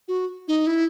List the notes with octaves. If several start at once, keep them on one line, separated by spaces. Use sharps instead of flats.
F#4
D#4
E4